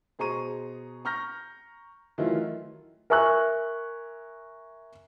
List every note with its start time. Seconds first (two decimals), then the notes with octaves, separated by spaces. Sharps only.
0.19 B2 G#4 C5 A#5 C#6 D#7
1.05 A#5 C#6 F6 G6 A#6
2.18 D#3 E3 F#3 A3 E4 F4
3.10 A#4 E5 G#5 C#6 E6 F#6